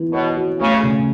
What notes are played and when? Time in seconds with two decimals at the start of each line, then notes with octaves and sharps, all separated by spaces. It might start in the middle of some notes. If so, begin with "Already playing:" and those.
Already playing: E3 B3
0.13 B2 C#5
0.37 F#4
0.60 C#3 A3
0.83 C#3